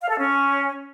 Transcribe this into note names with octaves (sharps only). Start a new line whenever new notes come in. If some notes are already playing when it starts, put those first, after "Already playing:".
F5
A4
C#4